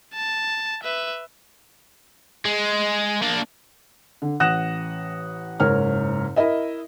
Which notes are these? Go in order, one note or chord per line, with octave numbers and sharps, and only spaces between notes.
A5
B4 E5
G#3
A#3 D4
D3
A1 F#5 D#6 F#6 A#6 E7
F#1 G#2 A#4 C#5 F6
E4 A#4 D#5 E5